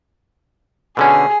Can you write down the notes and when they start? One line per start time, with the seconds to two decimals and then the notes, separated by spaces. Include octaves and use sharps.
0.97 B2 D3 C#4 G#4